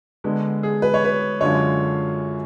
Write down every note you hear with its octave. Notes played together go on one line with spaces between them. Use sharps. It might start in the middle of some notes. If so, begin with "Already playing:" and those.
D3 G#3 B3 D4
G#4
B4
C#5
B4
F#2 D3 G#3 D4 F4 C#5